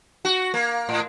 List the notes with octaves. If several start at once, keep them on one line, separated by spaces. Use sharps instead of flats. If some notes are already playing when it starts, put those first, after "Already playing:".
F#4
A#3
A2